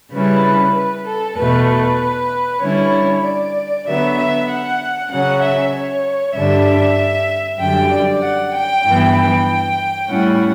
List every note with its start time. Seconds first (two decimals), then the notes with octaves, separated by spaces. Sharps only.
0.12 C#3 G3 C#4 E4 B4
0.74 B4
1.06 A4
1.37 E2 B2 A3 B4
1.68 B4
2.62 D3 G3 C#4 E4 C#5
3.23 D5
3.87 D3 F#3 B3 E5
4.17 E5
4.48 F#5
5.11 C#3 F#3 C#4 F#5
5.42 E5
5.74 C#5
6.35 G2 D3 G3 D4 E5
7.60 F#2 D3 G3 G5
7.91 D5
8.22 F#5
8.54 G5
8.86 G2 E3 B3 E4
9.16 G5
10.09 A2 G3 C#4 E4 F#5